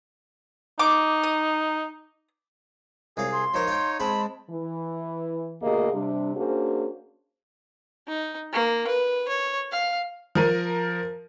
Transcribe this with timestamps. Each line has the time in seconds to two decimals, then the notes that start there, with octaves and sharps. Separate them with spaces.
0.79 D#4 D6
1.23 D#6
3.17 C2 G#4 C#5 F5
3.32 C6
3.54 F3 D#4 A#4 C#5
3.67 F4 G5
4.00 G#3 C4 A5 B5
4.50 E3
5.62 D2 B2 A#3 G4 G#4 D#5
5.93 C3 G3 D4
6.36 A#3 C#4 D4 F#4 G#4 C5
8.08 D#4
8.53 A#3
8.87 B4
9.28 C#5
9.72 F5
10.35 F3 A#4 D#7